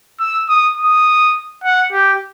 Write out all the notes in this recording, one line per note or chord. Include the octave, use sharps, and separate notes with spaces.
E6
D#6
D#6
F#5
G4